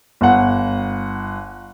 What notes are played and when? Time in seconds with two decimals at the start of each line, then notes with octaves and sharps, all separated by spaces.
0.21 G1 F#5